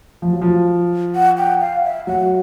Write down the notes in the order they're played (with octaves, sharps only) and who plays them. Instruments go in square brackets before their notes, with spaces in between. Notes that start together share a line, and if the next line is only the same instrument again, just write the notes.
[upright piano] F3
F#3
F3
[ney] F#5
G5
F5
E5
[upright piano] F#3 [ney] F#5